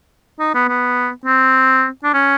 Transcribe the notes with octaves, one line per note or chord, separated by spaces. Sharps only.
D#4
B3
B3
C4
D4
C#4